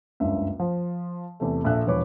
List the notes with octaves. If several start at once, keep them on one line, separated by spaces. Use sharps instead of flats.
F#1 C#2 G2 E5
F3
E2 C3 A3
A#1 A4 E5 F#6
E1 E2 F3 B4 C#5 D6